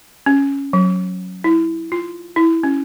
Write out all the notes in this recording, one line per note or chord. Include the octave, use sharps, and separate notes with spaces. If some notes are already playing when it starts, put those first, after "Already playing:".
C#4
F#3
E4
F4
E4
C#4